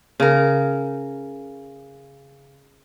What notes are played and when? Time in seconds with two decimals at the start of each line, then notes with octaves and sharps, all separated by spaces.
0.20 C#3 A#4